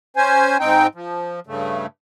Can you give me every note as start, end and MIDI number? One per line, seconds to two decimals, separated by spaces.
0.16 0.57 61
0.16 0.57 72
0.16 0.57 80
0.59 0.87 44
0.59 0.87 60
0.59 0.87 63
0.59 0.87 79
0.95 1.40 53
1.47 1.86 43
1.47 1.86 49
1.47 1.86 57